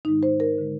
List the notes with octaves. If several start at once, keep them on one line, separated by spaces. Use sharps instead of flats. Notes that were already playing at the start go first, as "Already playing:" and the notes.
G#2 D#3 G#3 D#4
C5
A#4
D3 G#3